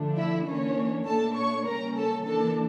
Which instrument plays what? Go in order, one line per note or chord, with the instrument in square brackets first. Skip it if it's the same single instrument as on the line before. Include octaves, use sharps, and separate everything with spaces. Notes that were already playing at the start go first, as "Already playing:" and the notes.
Already playing: [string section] D3 F3 A3 D4
E4 E5
E3 A#3 C#4 D4 C#5
A#2 A3 D4 A4 A5
C#5 C#6
C#3 G3 A#3 C#4 A#4 A#5
A4 A5
E3 A#3 D4 A4 A5